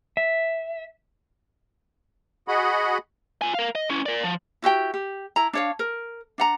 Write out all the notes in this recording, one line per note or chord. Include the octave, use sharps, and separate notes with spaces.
E5
F#4 G#4 D#5 F#5 B5
F4 G#5
A#4 F5
D#5
C#4 E4
A#4 D5
F3
E4 F#4 G4 G5
G4
E4 A#5
D4 C#5 F5
A#4
D4 F#5 A#5